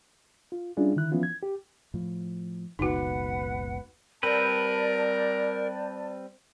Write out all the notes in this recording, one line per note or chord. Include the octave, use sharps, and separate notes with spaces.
F4
G3 C#4 D4 E4 F4 G#4
D3 D#3 E4 F#6
E3 F3 B3 C#4 E4 F4
G#6
G4
A2 F3
F#1 C#2 B2 D#4 F#4 B4 F#5
G3 C4 A#4 B4 D5 A5